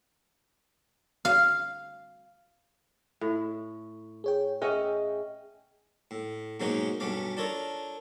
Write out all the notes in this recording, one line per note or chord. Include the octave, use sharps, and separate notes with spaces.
F5
A2
G#4 C#5 G5
C#4 G#4 D#5 E5 F#5 G5
A2
G#2 B2 F#3 A#3 C#4 D#4
B1 G2 A3 C#4 F5 D6
D4 F4 A4 A#4 C#5